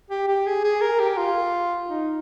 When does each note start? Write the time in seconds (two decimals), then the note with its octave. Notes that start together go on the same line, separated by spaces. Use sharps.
0.10 G4
0.28 G4
0.46 G#4
0.64 G#4
0.82 A#4
1.00 G4
1.17 F4
1.89 D#4